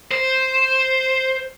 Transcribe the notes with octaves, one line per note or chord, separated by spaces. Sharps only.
C5